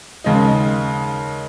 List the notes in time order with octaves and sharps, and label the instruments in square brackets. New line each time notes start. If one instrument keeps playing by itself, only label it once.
[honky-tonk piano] D#2 C#3 G#3 D#4